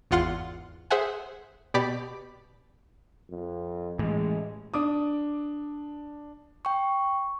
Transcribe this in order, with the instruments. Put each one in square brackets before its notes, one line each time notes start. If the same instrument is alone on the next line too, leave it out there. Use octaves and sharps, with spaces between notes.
[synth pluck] G#1 E2 F4 F#5 C6 F6
G#4 C5 E5 F#5 G#5
B2 G4 D5 B5 B6
[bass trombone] F2
[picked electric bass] A2 E3 [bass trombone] G#3
[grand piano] D4 D6 D#6
[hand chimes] G5 C#6